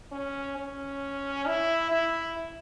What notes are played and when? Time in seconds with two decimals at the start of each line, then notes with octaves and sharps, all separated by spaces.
0.12 C#4
0.57 C#4
1.47 E4
1.91 E4